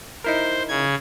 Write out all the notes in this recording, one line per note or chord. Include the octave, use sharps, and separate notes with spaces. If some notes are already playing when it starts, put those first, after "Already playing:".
D#4 E4 A#4 C5
C#3 G#6